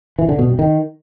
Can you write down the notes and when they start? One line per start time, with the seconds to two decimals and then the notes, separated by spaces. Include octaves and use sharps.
0.19 E3
0.29 D3
0.39 B2
0.49 G2
0.59 D#3